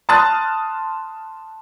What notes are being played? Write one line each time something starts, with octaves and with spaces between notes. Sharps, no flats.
A5 C6 D#6 F6 F#6 A6